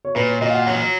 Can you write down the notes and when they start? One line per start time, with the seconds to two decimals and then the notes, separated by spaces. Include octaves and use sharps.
0.05 C#5
0.15 A#2 B4
0.28 C#5
0.42 A#2 D#5
0.50 F5
0.54 F#5
0.67 F#3 C#5